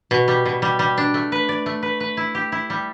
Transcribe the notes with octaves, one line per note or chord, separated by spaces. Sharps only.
B2
G3
B2
G3
G3
D4
A3
B4
D5
A3
B4
B4
E4
G4
E4
G3